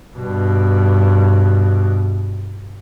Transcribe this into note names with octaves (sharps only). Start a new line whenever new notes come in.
G2 B2